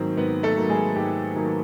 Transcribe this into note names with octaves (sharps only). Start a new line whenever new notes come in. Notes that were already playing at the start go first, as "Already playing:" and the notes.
Already playing: G#2 D#3 F#3 A#3 C4
G#2 B3 B4
A3 A4
D#3 F#3 A#3
G#3 G#4
G#2 G4
D#3 F#3 A#3